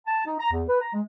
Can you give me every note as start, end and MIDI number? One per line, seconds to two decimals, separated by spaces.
0.06 0.21 81
0.26 0.35 63
0.40 0.48 82
0.52 0.62 40
0.69 0.80 71
0.81 0.92 82
0.93 1.01 56